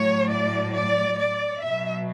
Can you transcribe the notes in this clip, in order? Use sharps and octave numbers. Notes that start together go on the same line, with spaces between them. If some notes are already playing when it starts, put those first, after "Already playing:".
Already playing: A2 F#3 C#5
D5
D5
D5
B2 F#3 E5